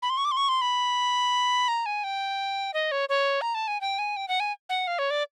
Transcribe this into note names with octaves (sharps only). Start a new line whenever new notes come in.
B5
C6
C#6
D6
C6
C#6
C6
B5
A#5
G#5
G5
D#5
C#5
C#5
A#5
A5
G#5
G5
G#5
G5
F#5
G#5
F#5
F5
C#5
D5